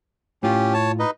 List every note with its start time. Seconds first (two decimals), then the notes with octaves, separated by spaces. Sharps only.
0.43 A2 C#4 F4 G4
0.74 C#5 A5
0.99 D#4 B4 D#5